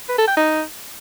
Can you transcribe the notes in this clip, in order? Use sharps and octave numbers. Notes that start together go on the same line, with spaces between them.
B4
A4
G5
D#4